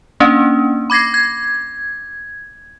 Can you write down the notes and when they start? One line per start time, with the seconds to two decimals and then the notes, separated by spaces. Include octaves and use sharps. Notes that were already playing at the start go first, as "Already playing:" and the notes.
0.20 A#3 C#4 D4
0.90 B5 D6 G#6 A#6 C7
1.14 G#6